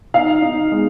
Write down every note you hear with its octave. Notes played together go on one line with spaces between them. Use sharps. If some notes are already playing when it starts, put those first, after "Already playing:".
D#4 F5
D#4
G#3